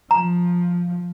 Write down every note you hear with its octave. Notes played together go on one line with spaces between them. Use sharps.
F3 A#5